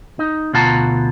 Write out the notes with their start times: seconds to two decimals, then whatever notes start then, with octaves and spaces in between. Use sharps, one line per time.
0.19 D#4
0.53 D2 B2 F4 F#5 A5 A#5